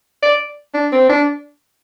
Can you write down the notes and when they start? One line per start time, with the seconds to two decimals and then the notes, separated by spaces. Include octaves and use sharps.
0.23 D5
0.74 D4
0.92 C4
1.09 D4